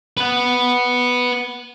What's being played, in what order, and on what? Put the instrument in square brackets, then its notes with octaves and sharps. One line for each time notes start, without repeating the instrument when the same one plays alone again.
[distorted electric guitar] B4 F#5